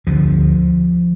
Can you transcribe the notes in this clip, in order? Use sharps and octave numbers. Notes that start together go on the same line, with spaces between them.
D2 D3 F3